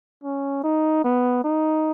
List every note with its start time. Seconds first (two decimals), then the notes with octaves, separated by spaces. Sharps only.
0.24 C#4
0.64 D#4
1.04 B3
1.45 D#4